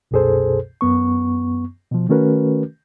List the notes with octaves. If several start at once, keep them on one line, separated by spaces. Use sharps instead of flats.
C2 F#2 B2 G#4 A4 C5
F#2 B3 C#6
B2 F3
D#3 A3 C#4 F#4 A#4 B4